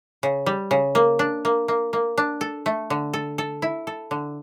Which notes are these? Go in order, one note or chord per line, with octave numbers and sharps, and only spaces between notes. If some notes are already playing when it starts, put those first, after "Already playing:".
C#3
G3
C#3
A#3
D4
A#3
A#3
A#3
D4
A4
A3
D3
A4
A4
E4
A4
D3